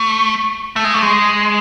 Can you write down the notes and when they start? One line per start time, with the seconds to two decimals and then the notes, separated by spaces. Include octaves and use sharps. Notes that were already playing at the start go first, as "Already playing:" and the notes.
Already playing: A3
0.76 A3
0.84 G#3
0.94 A3
1.02 G#3